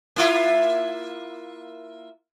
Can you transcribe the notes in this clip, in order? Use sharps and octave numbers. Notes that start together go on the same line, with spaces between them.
A#3 E4 F4